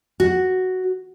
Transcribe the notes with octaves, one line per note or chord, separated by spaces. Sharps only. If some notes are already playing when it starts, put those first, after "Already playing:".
F#4